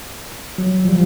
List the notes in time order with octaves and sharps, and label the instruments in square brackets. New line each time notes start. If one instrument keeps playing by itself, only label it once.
[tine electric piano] F#3
[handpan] F3 G3